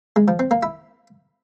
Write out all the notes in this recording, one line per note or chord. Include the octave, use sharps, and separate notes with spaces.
G#3
F3
C4
A#3
E4